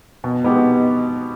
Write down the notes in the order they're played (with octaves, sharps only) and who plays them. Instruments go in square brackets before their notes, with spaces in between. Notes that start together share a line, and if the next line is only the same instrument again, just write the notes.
[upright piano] B2
G#3 B3 D#4 G4